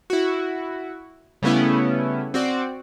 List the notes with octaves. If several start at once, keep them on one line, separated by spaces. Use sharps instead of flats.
E4 F#4
C#3 G3 A3 B3 C#4 E4
C4 F#4 D5